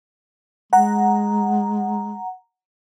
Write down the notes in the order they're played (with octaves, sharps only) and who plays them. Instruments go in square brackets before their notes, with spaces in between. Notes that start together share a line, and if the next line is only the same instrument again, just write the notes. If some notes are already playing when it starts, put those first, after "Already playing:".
[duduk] G#3 [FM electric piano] F#5 A#5